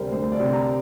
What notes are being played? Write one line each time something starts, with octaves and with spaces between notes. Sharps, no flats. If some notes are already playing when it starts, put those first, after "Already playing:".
Already playing: D2 C3 G3 A#4 C5
D2 C5
D5
C3
A#5